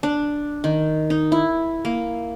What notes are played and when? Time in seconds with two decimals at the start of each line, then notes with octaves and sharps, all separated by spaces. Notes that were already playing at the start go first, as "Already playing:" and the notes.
0.03 D4
0.64 D#3
1.10 D#4
1.32 E4
1.85 A#3